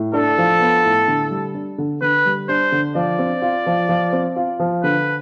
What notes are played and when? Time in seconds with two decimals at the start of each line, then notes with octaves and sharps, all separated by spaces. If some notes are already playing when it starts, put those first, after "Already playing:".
Already playing: A2
0.13 D4 A4
0.38 F3
0.60 B3
0.84 A2
1.08 D3
1.31 G3
1.55 D4
1.78 D3
2.01 D3 B4
2.26 G3
2.48 D4 C5
2.72 D3
2.95 F3 D5
3.19 C4
3.42 F4
3.66 F3
3.89 F3
4.13 C4
4.36 F4
4.60 F3
4.83 D3 B4